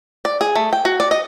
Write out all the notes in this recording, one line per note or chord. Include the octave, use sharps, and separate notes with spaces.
D5
G#4
A3
G5
F#4
D5
D#5